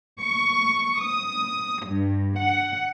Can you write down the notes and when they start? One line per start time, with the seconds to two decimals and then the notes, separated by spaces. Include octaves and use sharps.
0.22 C#6
1.03 D#6
1.86 G2
2.40 F#5